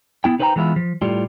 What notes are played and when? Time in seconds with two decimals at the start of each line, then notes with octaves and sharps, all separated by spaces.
0.24 B3 E4 G5
0.39 D#4 B4 C5 D5 G5 A#5
0.56 E3 G#3 B3 E4 F4
0.76 F3
1.02 A2 G3 F4